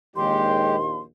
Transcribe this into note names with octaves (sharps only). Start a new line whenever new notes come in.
A#1 D#2 G#3 G4 C6